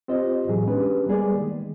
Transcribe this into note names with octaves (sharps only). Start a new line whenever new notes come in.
C4 F4 G4 C5 D#5
A2 E3 F#3 G#4
G#3 B3 C#4 D4 G4 B4
G3 A#3 B3 G#4 D5
D#3 G#3